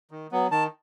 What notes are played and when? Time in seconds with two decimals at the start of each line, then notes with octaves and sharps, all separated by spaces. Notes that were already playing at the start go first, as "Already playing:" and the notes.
0.11 D#3
0.32 F#3 B3
0.51 D#3 A5